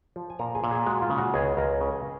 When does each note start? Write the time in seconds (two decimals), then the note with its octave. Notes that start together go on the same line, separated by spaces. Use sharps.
0.16 F3
0.30 G#5
0.39 A#2 A#4 A#5
0.55 G#4 G#5
0.64 A#2
0.71 G#4 G#5
0.87 G#3 F#4 F#5
1.02 F4 F5
1.10 C#3
1.18 F#4 F#5
1.34 C#2 G#4 G#5
1.57 C#2 A#4 A#5
1.81 C#3